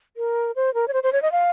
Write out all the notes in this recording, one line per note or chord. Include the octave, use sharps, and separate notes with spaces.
A#4
C5
A#4
C#5
C5
C5
C#5
D#5
F5